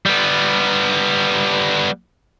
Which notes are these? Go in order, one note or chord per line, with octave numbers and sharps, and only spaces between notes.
G3 B3